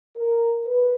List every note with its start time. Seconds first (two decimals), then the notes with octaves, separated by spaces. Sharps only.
0.17 A#4
0.66 B4